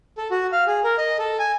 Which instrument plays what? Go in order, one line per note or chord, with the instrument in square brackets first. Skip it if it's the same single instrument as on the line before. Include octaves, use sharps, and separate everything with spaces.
[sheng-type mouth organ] A4
F#4
F5
G#4
A#4
D#5
A4
G#5